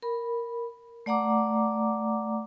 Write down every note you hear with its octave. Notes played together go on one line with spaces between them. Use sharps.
A#4 B5
A3 D5 F#5 A#5 D6